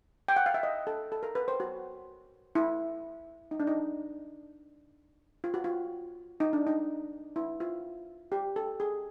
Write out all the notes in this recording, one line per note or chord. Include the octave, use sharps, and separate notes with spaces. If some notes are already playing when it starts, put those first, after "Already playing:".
G5
F#5
F5
E5
D#5
A4
A4
A#4
B4
C5
F#4
E4
D#4
D4
D#4
F4
F#4
F4
D#4
D4
D#4
E4
F4
G4
A4
G#4